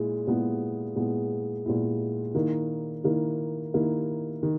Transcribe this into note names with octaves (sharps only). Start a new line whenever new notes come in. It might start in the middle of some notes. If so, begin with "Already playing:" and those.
Already playing: A#2 G#3 E4
A#2 G#3 B3 E4
A#2 G#3 B3 E4
A#2 G#3 B3 E4
D#3 A#3 E4
D#3 A#3 E4
D#3 A#3 E4
D#3